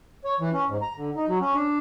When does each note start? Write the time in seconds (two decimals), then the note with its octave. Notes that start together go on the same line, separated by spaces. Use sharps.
0.24 C#5
0.40 E3
0.53 C#4
0.68 G#2
0.82 A#5
0.96 D3
1.16 D#4
1.28 F#3
1.41 C#4
1.55 D4